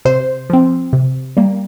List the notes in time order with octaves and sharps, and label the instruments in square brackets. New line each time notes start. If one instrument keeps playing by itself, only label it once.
[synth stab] C3 C5
F3 C4
C3
G3 A#3